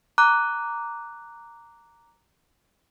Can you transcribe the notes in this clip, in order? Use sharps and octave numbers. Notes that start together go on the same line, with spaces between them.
A#5 D6 F#6